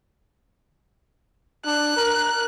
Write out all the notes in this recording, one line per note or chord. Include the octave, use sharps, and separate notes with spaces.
D4 F#6
A#4